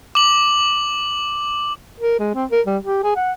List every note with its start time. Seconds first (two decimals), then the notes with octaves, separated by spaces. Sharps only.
0.15 D6 F#7
2.00 A#4
2.19 G#3
2.35 C4
2.51 A#4
2.66 G3
2.85 G4
3.03 G#4
3.16 F#5